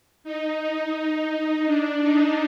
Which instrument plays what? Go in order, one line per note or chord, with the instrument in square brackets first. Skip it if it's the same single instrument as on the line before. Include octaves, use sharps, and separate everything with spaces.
[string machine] D#4
D4
D#4